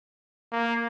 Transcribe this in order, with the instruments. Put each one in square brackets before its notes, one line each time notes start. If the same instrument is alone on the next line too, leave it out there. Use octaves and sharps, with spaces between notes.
[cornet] A#3